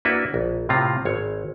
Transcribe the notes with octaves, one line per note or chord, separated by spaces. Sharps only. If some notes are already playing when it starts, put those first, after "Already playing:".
A#3 D4 E4 F#4 B4 E5
A#1
A2 C3 C4 F4 A#5
G#1 C#5